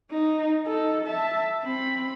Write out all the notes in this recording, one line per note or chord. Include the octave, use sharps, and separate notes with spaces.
D#4
D#4 A4
E5 A5
C4 B5